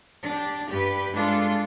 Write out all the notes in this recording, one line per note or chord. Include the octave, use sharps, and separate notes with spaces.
D4 G4
G2 G4 B4
G#3 D4 F4 A4